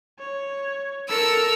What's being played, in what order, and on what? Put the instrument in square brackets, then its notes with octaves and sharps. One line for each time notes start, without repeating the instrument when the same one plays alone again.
[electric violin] C#5
[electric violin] A4 C#7 [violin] A#4 E6